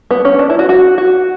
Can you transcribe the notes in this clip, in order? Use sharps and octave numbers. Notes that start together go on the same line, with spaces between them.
B3
C#4
D4
E4
F#4
F#4
F#4